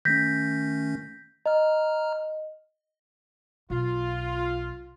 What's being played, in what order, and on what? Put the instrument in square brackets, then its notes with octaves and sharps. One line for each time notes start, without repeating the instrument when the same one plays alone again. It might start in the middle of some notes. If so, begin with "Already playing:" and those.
[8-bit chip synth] D#3 A3 C#4 [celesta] G6 A#6 B6
[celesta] D#5 [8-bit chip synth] A#5 F6
[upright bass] B1 [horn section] F4